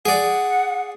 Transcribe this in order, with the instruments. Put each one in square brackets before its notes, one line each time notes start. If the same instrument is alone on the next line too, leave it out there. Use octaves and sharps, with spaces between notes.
[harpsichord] G#4 D5 [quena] F#5